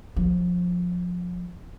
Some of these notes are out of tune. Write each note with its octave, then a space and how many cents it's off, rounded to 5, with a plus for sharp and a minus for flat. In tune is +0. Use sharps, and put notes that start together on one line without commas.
F3 +25 C#4 +45